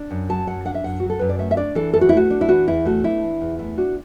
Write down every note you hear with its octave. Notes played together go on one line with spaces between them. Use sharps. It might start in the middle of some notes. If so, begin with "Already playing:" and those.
Already playing: D4
F#2
F#3 A5
F#2 F#5
D4 F#5
E5
F#2 F#5
F#3 F#4
A4
F#2 B4
D5
A3 E5
E5
D4 D5
E3 A4
E2 A4
F#4
E4
A3 F#4
D4
E4
E3 F#4
E2 E4
A3 F#4
D4 E4
E3
E2
A3 E4
D4 F#4